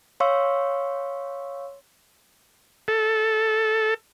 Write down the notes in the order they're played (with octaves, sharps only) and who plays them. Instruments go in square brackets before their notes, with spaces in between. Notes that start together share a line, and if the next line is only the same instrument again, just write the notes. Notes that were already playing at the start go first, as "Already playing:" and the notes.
[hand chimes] C#5 F5 C6 C#6 E6
[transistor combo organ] A4